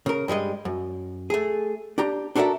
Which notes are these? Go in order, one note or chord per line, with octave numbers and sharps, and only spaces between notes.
C#3 A#4
G2 G3 G#3 D#5
F#2
A3 G#4
D4 G4 A#5
D4 F#4 A4 A#4 D5 E5